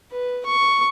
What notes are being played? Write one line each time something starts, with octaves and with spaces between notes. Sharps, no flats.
B4
C#6